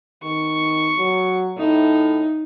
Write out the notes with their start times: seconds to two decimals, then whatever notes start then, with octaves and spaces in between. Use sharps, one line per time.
0.23 D#3 C#6
0.98 F#3
1.58 A2 D#4